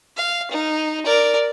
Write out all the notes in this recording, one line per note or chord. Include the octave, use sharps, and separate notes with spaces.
F5
D#4
A#4 D5